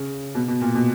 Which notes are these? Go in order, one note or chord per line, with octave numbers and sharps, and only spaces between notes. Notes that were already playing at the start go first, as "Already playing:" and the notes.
Already playing: C#3
B2
B2
A#2
B2